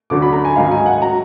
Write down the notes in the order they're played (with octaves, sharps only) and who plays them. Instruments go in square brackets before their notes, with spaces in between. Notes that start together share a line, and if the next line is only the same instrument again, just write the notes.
[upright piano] D2 D3 F#3 D6
B5
A#5
G#5
G#2 D#3 F#3 F5
G#5
F#5
F#3 A#5